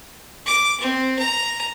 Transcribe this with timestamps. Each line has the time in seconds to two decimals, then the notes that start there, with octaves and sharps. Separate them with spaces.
0.46 D6
0.80 C4
1.19 A#5